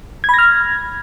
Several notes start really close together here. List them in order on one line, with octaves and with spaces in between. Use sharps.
G#6 B5 A#6 F6